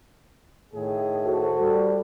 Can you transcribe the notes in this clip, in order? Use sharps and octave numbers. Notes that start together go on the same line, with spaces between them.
A2 D#3 G#4
F#4 A4 C5
G3